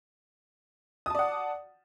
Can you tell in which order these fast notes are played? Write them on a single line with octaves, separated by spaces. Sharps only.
D#6 A5 D5 F#5